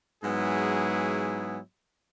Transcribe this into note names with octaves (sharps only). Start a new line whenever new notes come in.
G#2 F#3 B3 E4 G#4